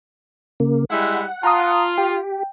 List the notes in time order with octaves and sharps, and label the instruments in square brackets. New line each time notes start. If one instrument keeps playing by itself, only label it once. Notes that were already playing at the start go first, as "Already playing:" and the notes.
[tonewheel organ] C#3 A#3
[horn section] G3 G#3 E4 [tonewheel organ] F#5
[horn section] F4 [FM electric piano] A5 A#5 D#6
[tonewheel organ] G4 [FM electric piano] G5